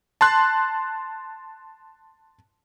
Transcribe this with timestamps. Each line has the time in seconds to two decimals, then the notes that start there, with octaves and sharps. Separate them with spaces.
0.21 A5 C6 F#6